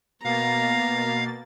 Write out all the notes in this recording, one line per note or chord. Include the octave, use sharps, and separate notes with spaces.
B2 A#3 B3 F5 A#5 A6